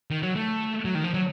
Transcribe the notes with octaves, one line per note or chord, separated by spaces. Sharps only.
D#3
F#3
A3
F#3
D#3
F3
F#3